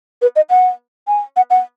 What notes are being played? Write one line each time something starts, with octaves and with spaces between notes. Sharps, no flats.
B4
D#5
F#5
G#5
F#5
F#5